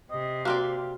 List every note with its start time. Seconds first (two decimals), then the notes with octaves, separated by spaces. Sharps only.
0.11 C3 D#5
0.45 A#3 C4 F#4 D5 F5